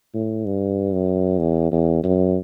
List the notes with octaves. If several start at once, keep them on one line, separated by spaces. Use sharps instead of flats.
A2
G2
F#2
E2
E2
F#2